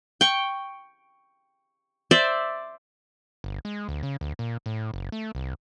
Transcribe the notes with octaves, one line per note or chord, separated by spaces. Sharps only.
G5 C#6
C5 D5 E5
G1
G#3
D2
C#3
D2
A#2
A2
F#1
A3
C2